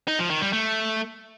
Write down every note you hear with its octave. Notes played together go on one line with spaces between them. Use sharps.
D#4
F3
D#3
G3
A3